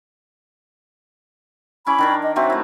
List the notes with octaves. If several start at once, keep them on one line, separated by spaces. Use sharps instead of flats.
C#4 E4 B5 D6
D#3 D4 A#4
D#5
F#3 C4 C5 E5
A3 E4